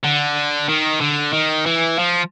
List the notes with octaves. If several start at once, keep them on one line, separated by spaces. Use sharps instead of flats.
D3
D#3
D3
D#3
E3
F3